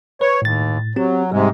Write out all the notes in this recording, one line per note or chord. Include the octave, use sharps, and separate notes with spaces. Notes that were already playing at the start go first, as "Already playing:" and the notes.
B4 C#5
D#2 A2 A6
F#3 C4 G4
G#2 C3 G3 G#3